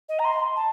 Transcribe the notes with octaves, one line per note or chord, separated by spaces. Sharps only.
D#5
A#5
C6
A5